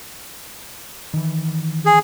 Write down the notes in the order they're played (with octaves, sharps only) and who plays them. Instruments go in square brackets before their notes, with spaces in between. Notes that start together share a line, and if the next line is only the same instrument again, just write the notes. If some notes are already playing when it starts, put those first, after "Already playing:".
[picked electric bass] D#3 E3
[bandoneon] G#4